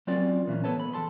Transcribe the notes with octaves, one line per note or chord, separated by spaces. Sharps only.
F#3 C4 C#4 F4 A#4 D5
A#2 E3 A#3 C#4
B3 A4 B4 C#5 A5
B5
E2 C3 A4 A5 C6